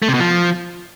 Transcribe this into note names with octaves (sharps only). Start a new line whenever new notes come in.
A3
C3
B2
F3